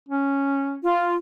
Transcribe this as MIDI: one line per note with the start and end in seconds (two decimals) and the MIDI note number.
0.09 0.81 61
0.83 1.15 65